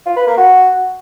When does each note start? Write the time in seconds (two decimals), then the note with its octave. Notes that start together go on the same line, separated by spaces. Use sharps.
0.06 F4
0.16 B4
0.27 A#3
0.37 F#4